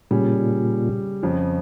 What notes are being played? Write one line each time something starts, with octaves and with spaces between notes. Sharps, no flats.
A#2 C#3 G3 C#4 G#4 C#5
F2 C#3 F3